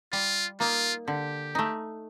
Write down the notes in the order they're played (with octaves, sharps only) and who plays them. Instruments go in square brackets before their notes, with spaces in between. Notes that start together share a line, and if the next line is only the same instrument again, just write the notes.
[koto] G3 [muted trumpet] F4
[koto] A#3 D#4 [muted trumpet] F4
[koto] D3 [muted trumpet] G4
[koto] A3 D#4